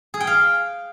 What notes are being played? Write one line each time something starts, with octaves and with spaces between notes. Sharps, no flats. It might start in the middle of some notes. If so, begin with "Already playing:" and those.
G#4
G5
F5